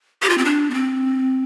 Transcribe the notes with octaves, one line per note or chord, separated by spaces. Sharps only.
G4
F4
C4
D4
B3
C4